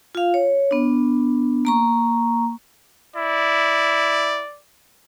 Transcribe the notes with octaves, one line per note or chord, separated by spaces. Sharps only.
F4 F5
C#5
B3 D4
A#3 A#5 C#6
E4 D5